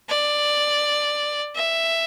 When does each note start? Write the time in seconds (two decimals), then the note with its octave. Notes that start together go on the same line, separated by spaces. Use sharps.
0.09 D5
1.56 E5